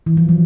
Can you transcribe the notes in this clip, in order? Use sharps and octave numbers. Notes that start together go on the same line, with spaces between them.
E3
F3
F#3